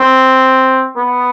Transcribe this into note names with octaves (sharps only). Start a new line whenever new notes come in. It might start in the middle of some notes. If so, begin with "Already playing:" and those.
Already playing: C4
B3